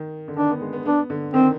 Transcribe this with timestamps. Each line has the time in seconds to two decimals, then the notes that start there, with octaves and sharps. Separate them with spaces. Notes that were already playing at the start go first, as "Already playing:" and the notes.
Already playing: D#3
0.28 D3
0.37 D#3 D4
0.51 B3
0.61 G#3
0.73 B3
0.85 B3 D4
1.10 D3
1.34 D#3 C4